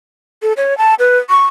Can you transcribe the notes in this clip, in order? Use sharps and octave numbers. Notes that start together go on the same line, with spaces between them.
A4
C#5
A5
B4
C#6